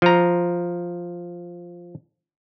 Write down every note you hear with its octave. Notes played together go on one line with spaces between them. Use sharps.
F3 A#5